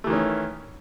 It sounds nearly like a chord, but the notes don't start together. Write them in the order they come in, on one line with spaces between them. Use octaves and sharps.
A3 E3 D#3 C#4